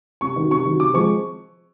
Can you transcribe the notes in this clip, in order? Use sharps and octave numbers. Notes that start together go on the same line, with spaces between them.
C3 C#6
D#3 F#3
C3 C#6
D#3 F#3
C3 D6
F3 G#3 C4 C#6